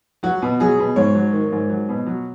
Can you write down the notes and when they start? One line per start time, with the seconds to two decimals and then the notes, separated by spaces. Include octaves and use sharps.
0.23 F#3 F#4
0.42 B2
0.60 F#3 G#4
0.79 B2
0.96 G#2 C#5
1.14 F#3
1.33 D#3
1.52 G#2
1.69 F#3
1.89 B2
2.06 F#3